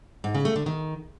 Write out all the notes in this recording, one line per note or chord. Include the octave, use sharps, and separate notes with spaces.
G#2
C#3
A3
D3
D#3